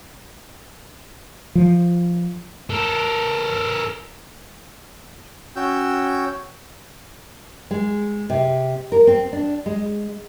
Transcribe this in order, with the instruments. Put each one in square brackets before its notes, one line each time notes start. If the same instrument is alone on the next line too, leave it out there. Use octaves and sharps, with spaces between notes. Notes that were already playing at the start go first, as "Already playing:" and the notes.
[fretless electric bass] F3
[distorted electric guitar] A4 A#4
[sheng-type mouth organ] C#4 F#4 C#5 G5 E6 G6
[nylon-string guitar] G#3
C3
A#4
C4
D4
G#3